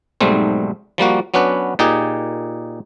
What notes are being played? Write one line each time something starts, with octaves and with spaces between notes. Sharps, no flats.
B1 G#2 G3 A3 C4
F3 G3 A#3 F#4
F#3 B3 C#4 D4 B4
A#2 D#4 G4 G#4